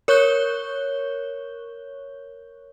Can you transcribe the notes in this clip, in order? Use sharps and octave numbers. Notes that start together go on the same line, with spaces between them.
A#4 C#5 C#6 F#6 G6 G7